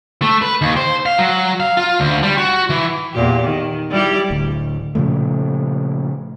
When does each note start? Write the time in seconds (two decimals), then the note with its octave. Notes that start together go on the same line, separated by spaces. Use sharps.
0.22 A3
0.42 B4
0.62 D#2
0.77 C5
1.06 F5
1.18 F#3
1.60 F5
1.77 F4
2.00 D2
2.23 G3
2.38 F#4
2.70 E3
3.13 E2 A#2 G4
3.44 D#3
3.91 G3 E4 G4
4.30 D1 D2
4.95 A#2 C#3 F3 A3